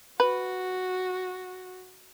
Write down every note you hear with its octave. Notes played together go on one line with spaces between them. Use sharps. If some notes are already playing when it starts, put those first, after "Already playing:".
F#4 B4